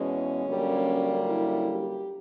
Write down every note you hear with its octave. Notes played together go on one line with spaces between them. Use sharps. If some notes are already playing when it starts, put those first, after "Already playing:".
Already playing: E2 B2 G#3 C#4
F#2 D3 G3 A#3
E4
G4